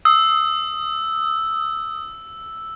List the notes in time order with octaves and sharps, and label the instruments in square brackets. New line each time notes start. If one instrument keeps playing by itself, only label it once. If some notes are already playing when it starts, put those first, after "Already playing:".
[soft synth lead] D#6 [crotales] E6